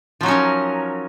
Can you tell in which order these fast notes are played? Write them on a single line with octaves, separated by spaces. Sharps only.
F3 F#3 D#4 C#4 A#4